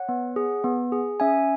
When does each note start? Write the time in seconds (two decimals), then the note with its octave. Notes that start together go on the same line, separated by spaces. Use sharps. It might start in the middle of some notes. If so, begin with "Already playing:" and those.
Already playing: C#5 F#5
0.09 B3
0.36 G#4
0.64 B3
0.92 G#4
1.20 C#4 E5 G#5